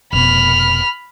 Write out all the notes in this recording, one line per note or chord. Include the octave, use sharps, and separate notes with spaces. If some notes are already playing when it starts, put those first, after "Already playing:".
F1 B2 B5 F6